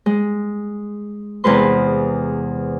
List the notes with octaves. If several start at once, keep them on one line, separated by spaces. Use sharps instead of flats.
G#3
E2 C3 G#3 B4 C6